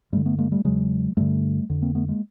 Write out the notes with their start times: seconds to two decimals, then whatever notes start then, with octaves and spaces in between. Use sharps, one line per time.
0.12 G2 D3 G3 A3
0.26 A3 B3
0.38 G#3 A#3
0.52 G3 A3
0.65 E2 C#3 F#3 G#3
1.17 G2 D3 G3 A3
1.70 F2 D3
1.82 A#3 C4
1.95 A3 B3
2.08 G#3 A#3